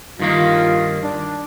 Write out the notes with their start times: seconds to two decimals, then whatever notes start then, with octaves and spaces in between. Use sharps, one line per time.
0.20 G2 D#3 A#3 F4
1.03 D4